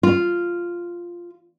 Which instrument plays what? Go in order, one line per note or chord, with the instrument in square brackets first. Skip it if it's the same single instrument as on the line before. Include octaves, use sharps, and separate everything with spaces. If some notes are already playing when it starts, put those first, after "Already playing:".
[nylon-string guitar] F4